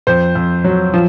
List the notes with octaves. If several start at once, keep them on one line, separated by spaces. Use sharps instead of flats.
F2 C5
F2
F#3
F3